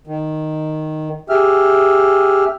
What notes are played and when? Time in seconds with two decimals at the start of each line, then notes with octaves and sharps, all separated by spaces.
0.07 D#3
1.29 G4 G#4 E5 F6